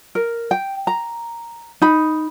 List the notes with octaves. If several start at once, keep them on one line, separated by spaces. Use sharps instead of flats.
A#4
G5
A#5
D#4 B5